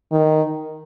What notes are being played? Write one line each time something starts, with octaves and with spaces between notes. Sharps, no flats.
D#3